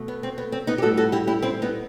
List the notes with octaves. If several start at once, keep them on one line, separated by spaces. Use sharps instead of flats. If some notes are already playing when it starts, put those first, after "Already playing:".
Already playing: B2 A3
B3
C4
B3
C4
B3 D#4
G4
A2 G3 F#4 A4
F#4 A4
E4 G4
E4 G4
C4 E4
B3 D#4